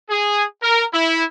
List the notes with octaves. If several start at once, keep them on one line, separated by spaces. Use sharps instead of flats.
G#4
A#4
E4